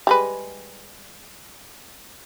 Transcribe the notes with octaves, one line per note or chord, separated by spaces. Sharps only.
G3 G#3 B4